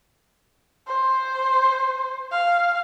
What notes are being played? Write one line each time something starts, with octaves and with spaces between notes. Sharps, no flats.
C5
F5